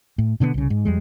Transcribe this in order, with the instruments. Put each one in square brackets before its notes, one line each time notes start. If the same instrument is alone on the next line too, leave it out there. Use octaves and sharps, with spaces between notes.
[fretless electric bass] A2
B2 D3 E3 B3
C2 C#3
G#2
F2 G3 G#3